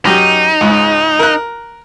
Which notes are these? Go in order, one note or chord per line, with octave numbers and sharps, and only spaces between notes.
F#2 D#4 G4
C#2 G#2
A#4 F#6